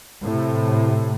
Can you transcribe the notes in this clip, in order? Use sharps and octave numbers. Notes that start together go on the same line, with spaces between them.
A2 C3